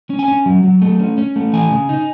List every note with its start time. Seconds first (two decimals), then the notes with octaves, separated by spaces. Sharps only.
0.10 C#4
0.19 G#5
0.28 C#4
0.46 F#3
0.64 F#3
0.82 A3
1.00 C#4
1.18 C#4
1.36 A3
1.53 E3 G#5
1.72 C#3
1.89 D#4